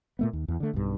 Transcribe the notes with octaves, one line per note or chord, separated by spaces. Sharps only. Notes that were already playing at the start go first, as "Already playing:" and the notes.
A#2 A3 B3
D#2
E2
D3 A3
B1 G2